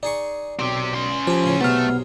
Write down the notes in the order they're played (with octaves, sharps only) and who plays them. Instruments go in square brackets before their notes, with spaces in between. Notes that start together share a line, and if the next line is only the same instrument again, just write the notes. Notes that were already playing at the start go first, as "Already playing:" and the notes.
[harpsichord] D#4 G#4 C#6 [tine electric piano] D5
[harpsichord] B1 [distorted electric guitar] C4 G4
[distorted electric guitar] C#4 C6
[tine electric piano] F3 [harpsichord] G4 G#5
[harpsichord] A2 C#3
[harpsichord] B1 C3 G#4 [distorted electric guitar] A3 A4 [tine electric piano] B3 F6